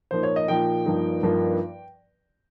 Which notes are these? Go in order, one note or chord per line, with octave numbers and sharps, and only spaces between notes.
A#2 F3 A#3 D#4 C5
C#5
D#5
A#2 F3 A#3 D#4 G5
G2 F3 A#3 D#4
G2 F3 A#3 D#4